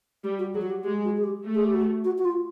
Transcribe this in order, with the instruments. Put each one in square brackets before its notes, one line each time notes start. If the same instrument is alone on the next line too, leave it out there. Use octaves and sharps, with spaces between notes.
[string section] G3 [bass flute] G4
[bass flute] F#4
[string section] F#3 [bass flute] G#4
[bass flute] F#4
G4
[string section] G#3 [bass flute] G4
[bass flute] F#4
G#4
G4
[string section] A3
[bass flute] G#4
G4
F#4
F#4
F#4
F4